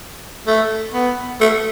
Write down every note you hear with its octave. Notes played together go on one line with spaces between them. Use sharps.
A3
B3
A3